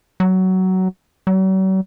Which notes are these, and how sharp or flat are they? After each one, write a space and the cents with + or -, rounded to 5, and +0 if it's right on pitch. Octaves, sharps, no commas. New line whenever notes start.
F#3 +15
F#3 +45